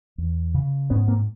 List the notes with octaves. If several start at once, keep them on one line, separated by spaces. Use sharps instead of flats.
E2
C#3
G#2 B3 C#4
A#3 C4